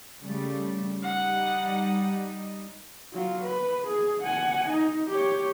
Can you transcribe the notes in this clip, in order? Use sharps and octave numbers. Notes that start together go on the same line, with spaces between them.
C#3 G3 A3
G3 D#4 F#5
F#3 F4
B4
G#4
F#5 G#5
D#4
G4 C#5